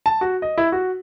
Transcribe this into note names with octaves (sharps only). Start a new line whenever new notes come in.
A5
F#4
D#5
E4
F#4